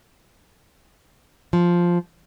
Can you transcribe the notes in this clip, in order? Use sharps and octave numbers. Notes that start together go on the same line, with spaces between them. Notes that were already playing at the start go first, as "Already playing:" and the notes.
F3